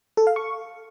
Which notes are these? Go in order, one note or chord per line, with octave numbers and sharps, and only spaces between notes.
A4
F5
C#6